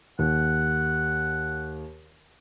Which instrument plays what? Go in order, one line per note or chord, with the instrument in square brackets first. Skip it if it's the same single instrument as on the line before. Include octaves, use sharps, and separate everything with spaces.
[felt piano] D#2 [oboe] F#5